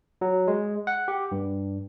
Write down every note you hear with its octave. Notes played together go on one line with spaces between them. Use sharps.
F#3
G#3
F#5
G4
G2